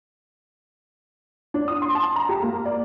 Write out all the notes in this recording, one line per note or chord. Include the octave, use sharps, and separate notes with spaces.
D4
D#6
C6
A5
A#5
G4
A#3
D5